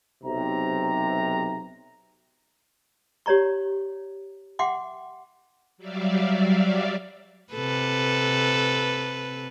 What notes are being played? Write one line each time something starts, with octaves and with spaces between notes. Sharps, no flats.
B1 C3 A#5
G4 C#5 D5 A#5 C#6
E5 F#5 G5 C6 D6
F#3 G3 D5 E5 F5
C3 A4 B4